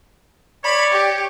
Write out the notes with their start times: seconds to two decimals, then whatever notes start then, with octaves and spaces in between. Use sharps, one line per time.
0.64 C#5 D5 B5
0.92 G4